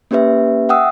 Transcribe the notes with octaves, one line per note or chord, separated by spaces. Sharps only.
A#3 C#4 G4 B4 E5
E5 F#5 G5 D#6 E6